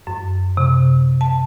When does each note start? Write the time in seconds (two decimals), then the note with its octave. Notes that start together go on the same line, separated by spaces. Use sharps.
0.07 F#2
0.57 C3
1.21 A5